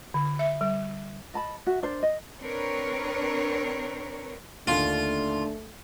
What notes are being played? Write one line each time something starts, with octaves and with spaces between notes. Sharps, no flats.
D3
E5
G3
D#5 A5 B5
F#4 E5
D4 A#4 C5 D5
D#5
C4 D4 A#4 B4 C#5
D#2 D3 A3 D4 F4